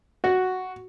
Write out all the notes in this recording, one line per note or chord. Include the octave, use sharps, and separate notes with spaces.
F#4